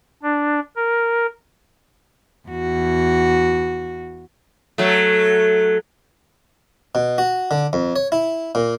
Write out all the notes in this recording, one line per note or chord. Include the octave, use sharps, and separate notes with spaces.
D4
A#4
E2 F#4
F#3 A3
B2
F#4
D3
F2
C#5
E4
A#2